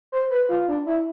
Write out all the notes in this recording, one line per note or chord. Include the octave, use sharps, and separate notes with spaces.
C5
B4
F4
D4
E4